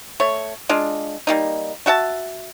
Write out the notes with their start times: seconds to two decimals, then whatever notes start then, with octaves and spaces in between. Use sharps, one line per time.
0.20 A3 C#5
0.69 G#3 D4 F4
1.27 G3 A#3 D#4
1.86 A3 F#4 E5 A5